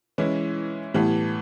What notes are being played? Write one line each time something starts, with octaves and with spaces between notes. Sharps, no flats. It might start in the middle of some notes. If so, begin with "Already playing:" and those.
E3 G#3 C#4 E4
A2 E3 G3 B3